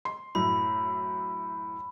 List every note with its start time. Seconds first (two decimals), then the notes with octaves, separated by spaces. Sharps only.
0.05 C6
0.35 F#2 A2 B5